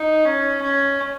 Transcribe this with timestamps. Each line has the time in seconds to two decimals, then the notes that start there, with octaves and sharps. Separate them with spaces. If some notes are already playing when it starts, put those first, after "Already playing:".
Already playing: D#4
0.25 C#4
0.62 C#4